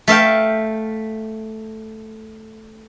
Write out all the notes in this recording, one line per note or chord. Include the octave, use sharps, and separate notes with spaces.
A3 E5 F5 G5